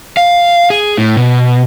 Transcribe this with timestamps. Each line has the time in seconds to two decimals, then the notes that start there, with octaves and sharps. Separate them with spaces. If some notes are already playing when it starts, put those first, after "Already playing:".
0.17 F5
0.70 G#4
0.97 A2
1.17 B2